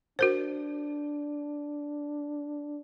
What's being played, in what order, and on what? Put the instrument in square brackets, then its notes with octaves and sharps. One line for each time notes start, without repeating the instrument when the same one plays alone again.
[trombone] D4 [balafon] F#4 A#4 C5